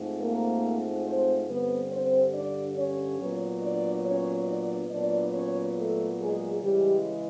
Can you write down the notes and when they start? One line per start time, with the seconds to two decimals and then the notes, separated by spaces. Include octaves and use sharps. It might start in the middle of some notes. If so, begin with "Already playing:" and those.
Already playing: G#2 F3 A3 C4
0.19 A#3 A#4
1.05 C4 C5
1.47 G2 D3 G3 B3 C4 B4
1.91 C4 C5
2.33 D4 D5
2.76 C#4 C#5
3.19 A#2 F#3 B3
3.62 D4 D5
4.05 C#4 C#5
4.48 D4 D5
4.91 A#2 F#3 B3 D4 D5
5.34 C#4 C#5
5.77 A3 A4
6.19 G#3 G#4
6.62 C#3 E3 G3 G#3 G4